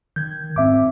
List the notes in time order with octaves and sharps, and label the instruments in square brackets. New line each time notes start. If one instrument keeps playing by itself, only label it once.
[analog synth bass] D#3 [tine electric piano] G6 G#6
[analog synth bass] G#2 [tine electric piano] C4 E5 D6